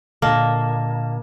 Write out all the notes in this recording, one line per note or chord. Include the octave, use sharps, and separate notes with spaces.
A#2 D3 A#3 D#5 A5